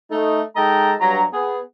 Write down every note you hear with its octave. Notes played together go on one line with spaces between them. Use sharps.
A3 D#4
G#3 D#4 A4 D#5 G5 A#5
G2 F#3 A#5
B3 G#4